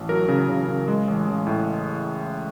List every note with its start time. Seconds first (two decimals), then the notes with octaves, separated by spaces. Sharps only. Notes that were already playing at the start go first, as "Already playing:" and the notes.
Already playing: A1
0.09 F#3 A#4
0.29 C#3
0.49 C#3
0.68 C#3
0.88 G#3
1.08 A1
1.27 A1
1.47 A2